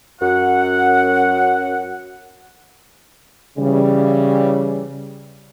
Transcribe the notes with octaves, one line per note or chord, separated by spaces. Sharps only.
F#2 F#5
C#3 E3 G3